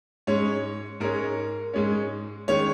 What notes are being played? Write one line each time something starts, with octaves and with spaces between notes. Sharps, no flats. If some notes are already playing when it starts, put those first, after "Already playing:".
G#2 G#3 C#4 C#5
G#2 G#3 C#4 A#4
G#2 G#3 C#4
D#3 G#3 C#4 C#5